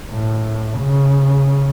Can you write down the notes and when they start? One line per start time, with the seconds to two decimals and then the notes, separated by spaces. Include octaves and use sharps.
0.11 A2
0.80 C#3